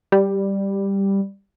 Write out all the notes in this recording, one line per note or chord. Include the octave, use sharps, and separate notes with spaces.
G3